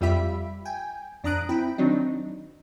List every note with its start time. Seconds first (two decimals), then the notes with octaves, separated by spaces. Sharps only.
0.01 F2 G3 F4 G4 E5 B5
0.65 G5 G#5
1.24 F2 D4 A#5 D#6 F#6 D7
1.49 C4 E4 G5 B5
1.78 D#3 F#3 C4 D4 D#4